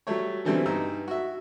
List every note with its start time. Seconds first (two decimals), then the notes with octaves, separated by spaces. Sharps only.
0.07 F#3 G3 A3 C#5
0.45 B2 D3 E3 G3 A3 C4
0.66 G2 D#4 E6
1.08 F#4 E5